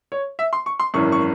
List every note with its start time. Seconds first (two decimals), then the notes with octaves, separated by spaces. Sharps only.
0.12 C#5
0.39 E5
0.53 C6
0.66 C#6
0.80 C6
0.94 G#1 F#2 E3 C#6
1.12 C#6